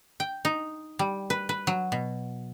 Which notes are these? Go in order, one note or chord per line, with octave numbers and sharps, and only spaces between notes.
G5
D#4
G3
B4
B4
F#3
B2